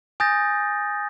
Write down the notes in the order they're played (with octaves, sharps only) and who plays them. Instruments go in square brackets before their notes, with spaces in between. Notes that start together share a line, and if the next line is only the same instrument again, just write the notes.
[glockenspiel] G#5 D#6 G6 A6 A#6